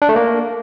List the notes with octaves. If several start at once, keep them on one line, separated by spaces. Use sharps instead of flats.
D4
A3
A#3